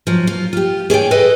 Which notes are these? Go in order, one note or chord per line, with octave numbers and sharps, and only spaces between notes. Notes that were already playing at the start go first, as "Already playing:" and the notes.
F3 F#3
F4
F4 G4
G#4 C#5 D5 G5
A4 B4 C5 D#5